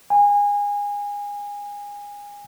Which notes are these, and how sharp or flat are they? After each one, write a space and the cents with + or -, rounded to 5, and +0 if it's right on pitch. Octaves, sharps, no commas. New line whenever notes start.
G#5 -25